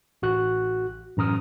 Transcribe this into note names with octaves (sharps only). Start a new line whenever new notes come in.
A1 F#4 F#6
A1 F#2 A#5 D#6 F6